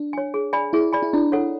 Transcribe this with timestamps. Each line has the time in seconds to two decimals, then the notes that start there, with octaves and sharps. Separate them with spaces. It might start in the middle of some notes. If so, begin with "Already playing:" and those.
Already playing: D4
0.13 C#5 G#5
0.34 G#4
0.53 D5 G#5 B5
0.73 E4 G#4
0.93 D5 G#5 B5
1.02 E4
1.13 D4 E4
1.32 A4 C#5 F#5